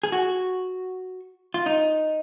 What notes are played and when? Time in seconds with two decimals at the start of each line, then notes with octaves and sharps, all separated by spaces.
0.03 G#4
0.12 F#4
1.54 F4
1.66 D#4